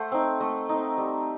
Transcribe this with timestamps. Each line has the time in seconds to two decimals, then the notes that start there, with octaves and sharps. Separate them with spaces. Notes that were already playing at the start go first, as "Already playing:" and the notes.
Already playing: A3 C5 F#5
0.12 C4 D#4
0.40 A3 D#5
0.69 C4 D#4
0.98 G3